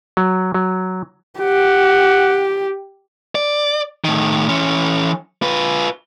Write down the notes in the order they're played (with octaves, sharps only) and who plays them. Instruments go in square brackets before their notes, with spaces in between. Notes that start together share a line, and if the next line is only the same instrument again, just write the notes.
[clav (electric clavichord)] F#3
F#3
[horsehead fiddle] G4 [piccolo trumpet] F#5
[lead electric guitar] D5
A2 D#3
E3 C#4
F4 B4